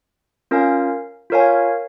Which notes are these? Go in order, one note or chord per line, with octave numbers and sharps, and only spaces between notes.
C#4 F4 A#4 F5 G#5
F4 A#4 C#5 F5 G#5